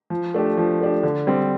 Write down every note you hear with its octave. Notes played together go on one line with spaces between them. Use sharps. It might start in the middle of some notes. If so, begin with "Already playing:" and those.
F3
A3 D4 G4
F3
A3 D4 G4
D3
G3 C4